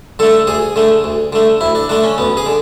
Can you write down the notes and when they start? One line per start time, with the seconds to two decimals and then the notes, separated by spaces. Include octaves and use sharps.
0.19 D3 A3 A4
0.47 D2 G#4
0.76 D3 A3
1.04 D2
1.33 D3 A3
1.61 D2 E4
1.75 D4
1.89 D3 A3 D4
2.04 C#4
2.18 D2 B3
2.37 G#4
2.46 D3